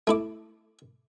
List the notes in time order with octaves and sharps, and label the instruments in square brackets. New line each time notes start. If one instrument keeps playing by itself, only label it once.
[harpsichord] A3 E4 D6